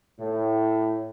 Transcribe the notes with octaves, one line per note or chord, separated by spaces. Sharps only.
A2